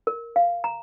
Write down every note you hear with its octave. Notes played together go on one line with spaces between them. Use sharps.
A#4
F5
A#5